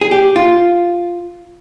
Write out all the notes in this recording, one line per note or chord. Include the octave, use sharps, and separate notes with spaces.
G#4
G4
F4